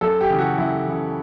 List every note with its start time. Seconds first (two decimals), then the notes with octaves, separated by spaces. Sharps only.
0.01 F#2 A4
0.21 G4
0.30 C#3 E3
0.39 F#4
0.57 F#2 E4
0.85 C#3 E3